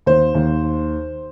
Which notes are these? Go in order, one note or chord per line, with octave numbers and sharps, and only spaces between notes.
D#2 C5
D#2